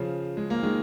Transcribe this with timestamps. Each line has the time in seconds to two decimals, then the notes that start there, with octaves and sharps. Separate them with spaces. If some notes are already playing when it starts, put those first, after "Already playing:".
Already playing: C#3 F3
0.37 G#3
0.50 A#3
0.63 D#3 G#3